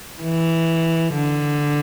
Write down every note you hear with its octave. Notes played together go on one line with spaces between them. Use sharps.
E3
D3